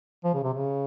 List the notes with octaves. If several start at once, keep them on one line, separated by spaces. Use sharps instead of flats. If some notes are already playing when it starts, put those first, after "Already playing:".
F3
C#3
C3
C#3